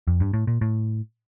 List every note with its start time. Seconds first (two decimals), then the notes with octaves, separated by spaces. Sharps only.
0.07 F2
0.20 G2
0.33 A2
0.47 A#2
0.61 A2